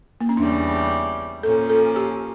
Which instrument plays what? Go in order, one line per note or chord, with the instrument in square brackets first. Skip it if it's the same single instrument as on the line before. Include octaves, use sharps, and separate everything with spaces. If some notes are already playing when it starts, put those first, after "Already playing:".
[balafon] A#3
C#4
[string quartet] E2 C#3 G3 [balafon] D4
[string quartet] A#2 F3 A#3 C#4 [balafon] A4
[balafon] A4
G4